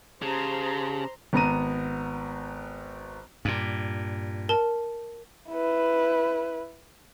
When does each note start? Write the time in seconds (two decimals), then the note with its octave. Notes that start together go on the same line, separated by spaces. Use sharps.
0.22 C#3 G4 C5 A5 A#5 C6
1.33 G#1 B3 A#5 D#7
3.45 G2 A#2
4.49 A#4 A5
5.50 E4 B4